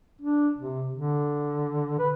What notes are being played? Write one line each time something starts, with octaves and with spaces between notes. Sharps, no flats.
D4
C3
D3
B4